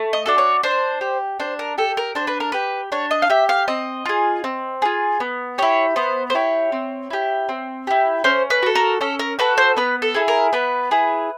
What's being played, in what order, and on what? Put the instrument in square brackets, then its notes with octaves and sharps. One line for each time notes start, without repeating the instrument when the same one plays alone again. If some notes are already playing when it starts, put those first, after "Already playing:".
Already playing: [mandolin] A3
D#5
D4 F#4 A4
C#5
D4 C5
G4
D4 C5
A#4
G4 A4
A#4
D4 C5
B4
A#4
G4 B4
D4 C#5
D#5
F5
G4 E5
F5
C4 D#5
F4 G#4
C4
F4 G#4
B3
E4 G4 C#5
B3 C5
C5
E4 G4 C#5
C4
E4 G4
C4
E4 G4
C#4 C5
B4
F#4 A4
A#4
C#4 A4
A#4
F#4 A4 B4
C5
B3 B4
A4
E4 G#4
A#4
B3 B4
E4 G#4